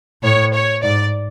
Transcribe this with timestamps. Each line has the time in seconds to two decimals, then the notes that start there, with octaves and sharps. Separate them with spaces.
0.23 A2 C#5
0.53 C#5
0.82 G#2 D5